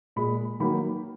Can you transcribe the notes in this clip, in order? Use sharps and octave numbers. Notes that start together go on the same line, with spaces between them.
A#2 G#3 B5
D#3 F#3 A#3 B5